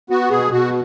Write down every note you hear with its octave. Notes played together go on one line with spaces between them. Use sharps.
B3 F#4
B2 G#4
B2 F#4